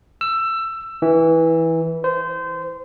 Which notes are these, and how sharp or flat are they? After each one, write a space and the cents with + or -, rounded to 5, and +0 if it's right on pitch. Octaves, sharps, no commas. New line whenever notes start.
E6 +20
E3 -15
C5 -25